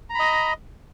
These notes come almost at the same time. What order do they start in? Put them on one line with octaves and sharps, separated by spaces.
A#5 B5 D#5